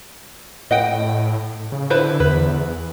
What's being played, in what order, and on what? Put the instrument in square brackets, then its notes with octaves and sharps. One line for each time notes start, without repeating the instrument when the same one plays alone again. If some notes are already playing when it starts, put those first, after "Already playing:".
[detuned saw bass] A2 [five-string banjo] D#5 F#5 G5
[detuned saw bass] C#3
[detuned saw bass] D3 [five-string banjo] E4 B4 C5
[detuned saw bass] E2 [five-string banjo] B4